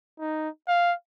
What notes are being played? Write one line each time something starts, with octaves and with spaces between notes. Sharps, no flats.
D#4
F5